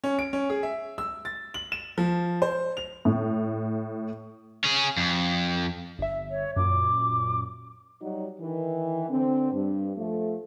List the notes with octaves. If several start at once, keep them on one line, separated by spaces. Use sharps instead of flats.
C#4
D7
C#4
G#4
E5
E6
A6
F#7
E7
F3
C5
F7
A2
C#4 G#4
F2
G1 E5
C#5
F#2 A#2 D6
F#3 G3 D#4 F#4
D#3 E3
D3 C4
G2
F3 A3